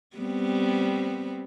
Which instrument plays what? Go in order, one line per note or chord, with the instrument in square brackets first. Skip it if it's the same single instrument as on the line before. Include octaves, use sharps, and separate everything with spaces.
[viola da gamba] G3 B3 C4